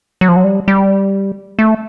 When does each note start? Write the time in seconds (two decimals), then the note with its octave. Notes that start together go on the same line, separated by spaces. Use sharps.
0.21 F#3
0.28 F3
0.36 F#3
0.44 G3
0.68 G3
1.59 A3